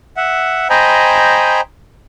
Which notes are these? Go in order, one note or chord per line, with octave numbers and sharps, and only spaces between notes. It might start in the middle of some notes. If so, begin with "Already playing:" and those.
E5 F#5
C5 D#5 G5 G#5 A#5 B5